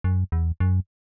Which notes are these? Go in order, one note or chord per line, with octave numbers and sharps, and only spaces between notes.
F#2
E2
F#2